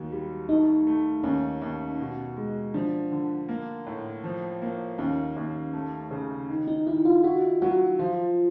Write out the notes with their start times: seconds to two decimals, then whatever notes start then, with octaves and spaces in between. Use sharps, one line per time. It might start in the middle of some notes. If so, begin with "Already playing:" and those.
Already playing: D#2 F#3
0.12 G3
0.49 A3 D#4
0.87 A3
1.23 D#2 C#4
1.62 D#2
1.99 B2
2.37 G#3
2.74 F3 D4
3.11 D3
3.49 A#3
3.87 A2
4.24 F3
4.62 A#3
4.98 D#2 C#4
5.36 D#2
5.73 A3
6.11 C#3
6.50 D#3
6.68 D#4
6.87 D#3 E4
7.05 F4
7.24 E4 F#4
7.62 F#3 F#4
7.99 F3 F4